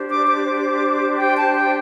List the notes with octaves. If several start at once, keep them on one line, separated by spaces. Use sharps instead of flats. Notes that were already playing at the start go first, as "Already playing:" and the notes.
Already playing: D4 G4 C5
D6
D6
G5
A5
G5